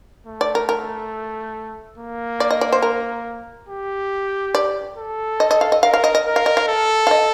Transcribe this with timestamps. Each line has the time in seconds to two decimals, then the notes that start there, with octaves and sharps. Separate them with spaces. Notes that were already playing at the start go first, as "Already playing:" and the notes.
0.27 A3
0.41 D5
0.55 A#4
0.69 A#4
1.98 A#3
2.40 D5
2.51 D#5
2.61 D5
2.72 C5
2.82 A#4
3.69 G4
4.55 D5
4.98 A4
5.40 D#5
5.51 D#5
5.61 F5
5.72 D#5
5.82 A#4 F5
5.94 F5
6.04 D#5
6.15 D#5
6.26 A#4
6.36 F5
6.46 D#5
6.57 F5
6.68 A4
7.07 F5
7.11 D#5